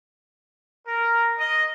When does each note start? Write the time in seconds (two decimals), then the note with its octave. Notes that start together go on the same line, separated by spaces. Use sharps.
0.87 A#4
1.39 D#5